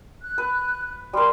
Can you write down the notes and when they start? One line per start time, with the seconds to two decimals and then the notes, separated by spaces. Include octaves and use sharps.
0.23 F#6
0.38 B4
1.13 G3 A#4 C6